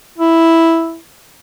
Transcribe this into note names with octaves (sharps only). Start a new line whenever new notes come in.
E4